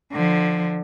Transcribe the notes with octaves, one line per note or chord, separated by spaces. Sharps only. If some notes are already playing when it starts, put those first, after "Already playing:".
D3 F3